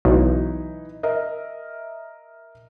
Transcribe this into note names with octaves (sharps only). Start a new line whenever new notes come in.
B1 E3 D#4
A#4 D#5 E5